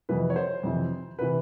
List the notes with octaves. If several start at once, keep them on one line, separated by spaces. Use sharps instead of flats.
F2 C3 E3 B4
C#5
C5
F2 C3 E3
C3 E3 B4